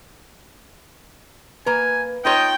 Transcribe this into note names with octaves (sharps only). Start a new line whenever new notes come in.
A#3 B4 G#5 A#5
D#4 F4 C#5 D#5 G5